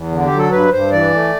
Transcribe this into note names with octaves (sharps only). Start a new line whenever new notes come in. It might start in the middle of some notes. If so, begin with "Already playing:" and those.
Already playing: E2
D3
G4
F#3
A4
G2 B4
G2 C5
E3 D5
A3